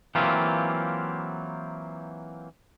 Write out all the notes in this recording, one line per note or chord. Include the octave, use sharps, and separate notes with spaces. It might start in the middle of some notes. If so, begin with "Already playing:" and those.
E3 F#3 A#3 C4 F4 G4